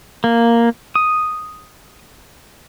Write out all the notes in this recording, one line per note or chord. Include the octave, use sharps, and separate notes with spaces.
A#3
D#6